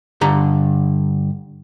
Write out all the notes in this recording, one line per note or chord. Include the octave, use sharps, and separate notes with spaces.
G2 D3 A#5